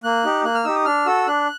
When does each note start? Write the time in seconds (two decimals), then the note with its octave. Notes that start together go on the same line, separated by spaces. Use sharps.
0.04 A#3 F#6
0.24 D#4 G4
0.44 A#3 F#6
0.55 F6
0.65 D#4 G4 E6
0.75 D#6
0.85 D4 F6
1.06 F#4 A4 E6
1.27 D4 F#6